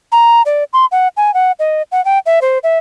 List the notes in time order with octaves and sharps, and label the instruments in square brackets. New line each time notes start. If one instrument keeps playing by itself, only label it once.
[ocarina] A#5
D5
C6
F#5
G#5
F#5
D#5
F#5
G5
E5
C5
E5